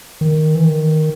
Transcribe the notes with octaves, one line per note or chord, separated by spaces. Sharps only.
D#3
E3
D#3